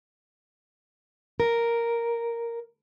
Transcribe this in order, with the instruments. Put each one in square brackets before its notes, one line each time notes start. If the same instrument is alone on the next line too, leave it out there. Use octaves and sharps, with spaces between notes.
[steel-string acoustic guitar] A#4